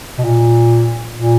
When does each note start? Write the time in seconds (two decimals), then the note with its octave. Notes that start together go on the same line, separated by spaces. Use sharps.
0.18 B2
0.25 A#2
1.17 A#2